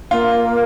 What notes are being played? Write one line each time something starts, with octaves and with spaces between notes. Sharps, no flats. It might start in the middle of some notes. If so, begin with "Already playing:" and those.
A#3 F4